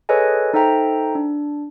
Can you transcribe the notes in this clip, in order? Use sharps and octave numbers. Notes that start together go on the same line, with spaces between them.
G#4 A4 B4 C#5 D#5 G#5
D#4 A4 C5 E5 G5 A#5
D4